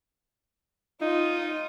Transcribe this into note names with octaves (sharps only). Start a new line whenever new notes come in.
D#4 F4